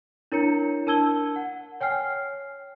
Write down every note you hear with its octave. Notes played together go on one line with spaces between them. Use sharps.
D4 E4 A#4 C#5 A#5 C#7
D4 A#4 A5 E6 G#6 G7
F#5
C#5 G5 G#5 F6 C7